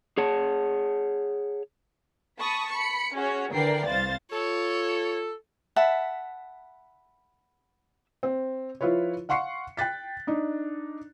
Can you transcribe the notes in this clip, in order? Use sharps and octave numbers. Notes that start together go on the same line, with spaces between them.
G#4 C#5 F#5 A5
A5 B5 C#6 D#6
B5 C#7
C#4 F#4 G#4 C#5
D3 E3 A#4 D5 G5 C7
C2 C5 F5 A6
F4 A4 C#5
E5 F#5 A5 B5
C4
F3 E4 F4 B4 C#5
F5 F#5 C6 C#6 C7 C#7
G5 F#6 A6 B6
D4 D#4